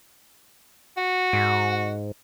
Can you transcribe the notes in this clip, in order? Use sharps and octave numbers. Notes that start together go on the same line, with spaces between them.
F#4
G#2